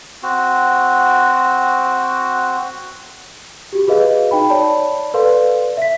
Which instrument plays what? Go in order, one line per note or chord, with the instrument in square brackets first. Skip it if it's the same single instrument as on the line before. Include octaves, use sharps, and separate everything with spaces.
[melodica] C4 F#4
[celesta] F#4 G4
F#4 G#4 B4 D#5 F5
D#4 G5 B5
C#5 D5 A5 B5
A4 B4 D5 F5 C6
E5 B6